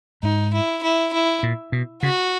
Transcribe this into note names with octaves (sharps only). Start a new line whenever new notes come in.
G#2 D#4
E4
E4
E4
A#2
B2
C#3 F#4